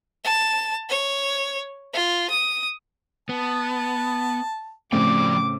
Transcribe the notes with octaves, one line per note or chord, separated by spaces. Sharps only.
A5
C#5
F4
D#6
B3 A5
A2 C#3 F3 C4 D5 G5 D6